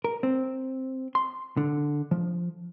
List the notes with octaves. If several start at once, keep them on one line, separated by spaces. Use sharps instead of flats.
A#4
C4
C6
D3
F3